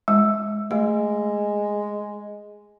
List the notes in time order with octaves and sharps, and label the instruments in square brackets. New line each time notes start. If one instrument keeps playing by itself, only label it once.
[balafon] G#3
[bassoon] G#3 [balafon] A3